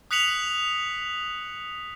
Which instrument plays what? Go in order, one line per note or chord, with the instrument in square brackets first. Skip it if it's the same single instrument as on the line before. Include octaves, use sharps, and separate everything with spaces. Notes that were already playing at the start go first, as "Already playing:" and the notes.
[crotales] D#6 F#6 B6 C#7 F7 F#7